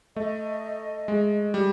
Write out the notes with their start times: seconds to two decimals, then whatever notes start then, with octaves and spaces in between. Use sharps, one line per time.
0.16 A3 D#5
1.08 G#3
1.54 G3